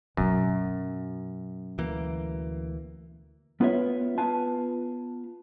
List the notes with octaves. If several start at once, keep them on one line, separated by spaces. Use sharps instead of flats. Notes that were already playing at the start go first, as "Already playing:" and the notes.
F#2 B2 C#4
D2 E3 A#3
B3 F4 B4 C#5 E5
B3 F4 B4 F5 G#5 A5